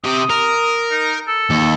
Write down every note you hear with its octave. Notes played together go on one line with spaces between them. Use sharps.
C3 G4 D#6
A#4
D#4
A4
D#2